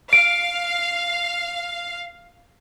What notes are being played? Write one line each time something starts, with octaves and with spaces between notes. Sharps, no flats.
F5 D7